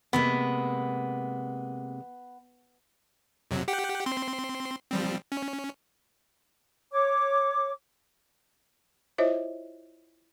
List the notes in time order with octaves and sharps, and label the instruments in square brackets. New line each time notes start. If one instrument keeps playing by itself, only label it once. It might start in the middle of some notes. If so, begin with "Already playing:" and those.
[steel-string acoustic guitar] C3 G#3 A#3 [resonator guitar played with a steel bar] B3
[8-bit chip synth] F2 C3 F#3
G4 F#5 G5
C4 C6
F3 G3 C4
C#4
[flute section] C#5 D6
[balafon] E4 F4 C5 C#5 D#5 E5